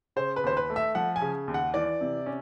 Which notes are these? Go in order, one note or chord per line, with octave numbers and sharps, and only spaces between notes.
C#3 C5
B4
D#2 C5
B4
A3
E5
F3 F#5
G#5
C#3
D#2
F#5
E3 D5
C3
C#4